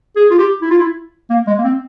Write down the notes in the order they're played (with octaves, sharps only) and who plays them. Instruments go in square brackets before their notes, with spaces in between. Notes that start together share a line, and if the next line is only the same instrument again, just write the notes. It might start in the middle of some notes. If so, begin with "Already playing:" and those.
[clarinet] G#4
F4
G4
E4
F4
E4
A#3
G#3
A#3
C4